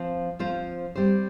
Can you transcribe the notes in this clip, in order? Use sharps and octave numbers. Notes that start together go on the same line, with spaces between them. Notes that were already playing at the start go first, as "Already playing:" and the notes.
Already playing: F3 C4 F4 C5
F3 C4 F4 C5
G3 C4 G4 C5